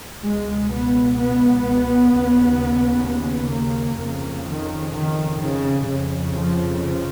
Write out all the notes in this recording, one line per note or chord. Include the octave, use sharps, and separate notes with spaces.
C#2 B2 G#3
B3
B3
D#2 C#3
B3
A#3
F2 C#3
D#3
D#3
C#3
F2 C#3
F3
F3